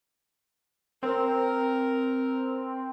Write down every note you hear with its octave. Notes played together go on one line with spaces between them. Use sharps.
C4 A#4